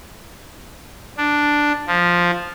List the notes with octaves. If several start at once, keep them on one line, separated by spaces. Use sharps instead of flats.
D4
F3